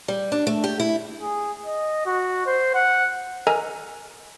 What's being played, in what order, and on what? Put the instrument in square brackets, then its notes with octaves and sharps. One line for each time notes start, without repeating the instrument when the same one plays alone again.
[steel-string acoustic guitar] G3
D4
A3
G4
E4
[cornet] G#4
D#5
F#4
C5
F#5
[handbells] A4 A#4 D#5 G#5 A#5 F6